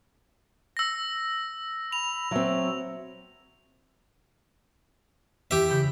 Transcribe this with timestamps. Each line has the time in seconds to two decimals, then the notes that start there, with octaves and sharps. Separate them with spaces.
0.77 E6 A#6
1.92 B5 F7
2.31 F#3 C4 E5
5.51 E3 G4 E5
5.70 C#3 B5 G6